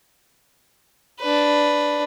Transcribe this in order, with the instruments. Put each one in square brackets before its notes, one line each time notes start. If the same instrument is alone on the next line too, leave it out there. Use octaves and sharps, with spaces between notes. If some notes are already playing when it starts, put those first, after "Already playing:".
[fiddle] D4 B4